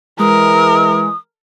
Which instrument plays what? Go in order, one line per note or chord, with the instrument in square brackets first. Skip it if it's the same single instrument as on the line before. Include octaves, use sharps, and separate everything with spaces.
[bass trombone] E3 [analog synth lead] G#3 [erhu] A#4 [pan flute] D#6